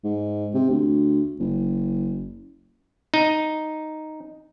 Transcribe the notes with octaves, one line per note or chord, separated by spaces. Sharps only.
G#2
C3
D2
F#1
D#4